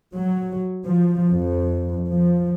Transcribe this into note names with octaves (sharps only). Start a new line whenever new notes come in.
F#3
F3
F2
F3